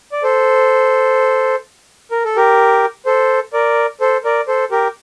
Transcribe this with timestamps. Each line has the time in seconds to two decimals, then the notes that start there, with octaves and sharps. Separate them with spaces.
0.12 D5
0.23 A4 C5
2.11 A#4
2.25 A4
2.36 G4 A#4
3.06 A4 C5
3.53 A#4 D5
4.01 A4 C5
4.24 A#4 D5
4.48 A4 C5
4.71 G4 A#4